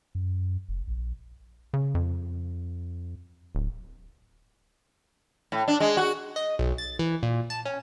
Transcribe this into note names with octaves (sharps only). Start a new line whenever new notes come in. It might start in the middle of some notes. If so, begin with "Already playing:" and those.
F#2
F1
A#1
C#3
F2
D1
A2
D4
G#3
F#4
D#5
B1
A6
E3
A#2
A5
C#4